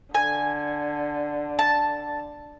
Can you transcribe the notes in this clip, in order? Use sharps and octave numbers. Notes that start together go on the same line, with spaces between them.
D3 G#5
A5